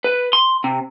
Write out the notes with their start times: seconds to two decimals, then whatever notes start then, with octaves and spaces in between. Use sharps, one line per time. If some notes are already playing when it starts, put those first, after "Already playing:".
0.04 B4
0.33 C6
0.64 C3